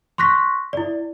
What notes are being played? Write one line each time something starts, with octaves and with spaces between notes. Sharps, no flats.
C6 C#6 F#6 A#6 B6
E4 D5